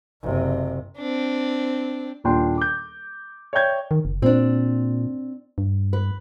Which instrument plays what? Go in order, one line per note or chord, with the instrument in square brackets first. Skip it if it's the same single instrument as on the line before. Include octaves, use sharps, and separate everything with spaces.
[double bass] F#1 C3
[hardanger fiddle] C4 D4
[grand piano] D#1 D#2 A#2 D4 G5 C6
D6 G6
C#5 D5 E5 G5 G6 G#6
[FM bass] D#3
F#1
[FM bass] A#2 [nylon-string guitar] C4 D4
[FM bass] G2
[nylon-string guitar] B4